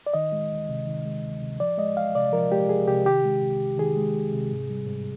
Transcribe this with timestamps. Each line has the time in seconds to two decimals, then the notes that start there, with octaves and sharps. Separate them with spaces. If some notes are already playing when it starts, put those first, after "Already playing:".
0.07 D5
0.14 D#3 D#5
0.32 G#3
0.51 D2
0.69 C3
0.87 D#3
1.05 G#3
1.24 D2
1.41 C3
1.59 F3 D5
1.78 G#3 D#5
1.96 C2 F5
2.15 C3 D5
2.33 F3 A#4
2.52 G#3 G4
2.69 C2 G#4
2.88 C3 G4
3.05 D#3 G4
3.25 G#3
3.42 C2
3.60 C3
3.78 D#3 G#4
3.96 G#3
4.16 C2
4.33 C3
4.51 G#2
4.70 G3
4.87 G#2